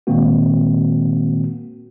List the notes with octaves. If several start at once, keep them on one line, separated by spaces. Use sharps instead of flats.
A#2 D#3 G#3 A#3 C4 F#4